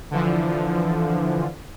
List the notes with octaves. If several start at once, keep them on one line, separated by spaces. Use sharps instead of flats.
D3 E3 F3